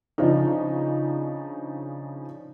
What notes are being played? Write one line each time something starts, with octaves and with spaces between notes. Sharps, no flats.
C#3 F3 D4 D#4